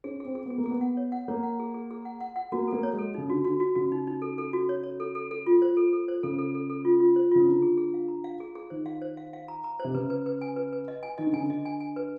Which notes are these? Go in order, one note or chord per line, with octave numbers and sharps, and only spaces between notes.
C#4 G#4
C4 G#4
G#4
B3 G#4
A#3
G#4
B3
F#5
C#5
F#5
A#3 C#5
F#5
G#4
G#4
G#4
F#5
F#5
F#5
A#3 F#4
A#3 A4
C#5
G#3
A4
C#3 D#4
D3 F#4
D3 F#4
F#4
C#3 F#4
D#4
D#4
A4
A4
F#4
C#5
C#5
A4
A4
A4
F4
C5
A4
A4
C5
C#3 A4
A4
A4
A4
F4
F4
C5
C#3 F4
D3 A#5
G#4
G#4
F5
A#5
F5
G#4
G#4
D#3 C5
F5
C5
F5
F5
A#5
A#5
C3 C5
C#3 B4
B4
B4
G#5
B4
B4
D#5
G#5
D#3 D#5
D3
C#3 G#5
D3
D#5
G#5
G#5
B4